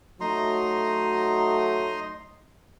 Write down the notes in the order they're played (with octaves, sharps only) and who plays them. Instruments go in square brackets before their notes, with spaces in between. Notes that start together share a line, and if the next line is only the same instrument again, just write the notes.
[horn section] F#3 A3 [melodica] D#4 A#5 C6